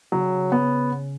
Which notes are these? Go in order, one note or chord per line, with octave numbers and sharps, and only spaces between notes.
C#3 F#3
B3